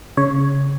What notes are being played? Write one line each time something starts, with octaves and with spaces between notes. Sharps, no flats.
C#3 C#5